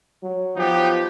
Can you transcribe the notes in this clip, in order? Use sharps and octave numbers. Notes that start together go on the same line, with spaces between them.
F#3
F3 B3 D#4 G4